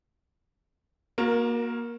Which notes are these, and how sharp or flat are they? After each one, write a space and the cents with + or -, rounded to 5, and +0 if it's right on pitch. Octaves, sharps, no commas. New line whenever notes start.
A#3 +20 F#4 -25 A#4 +0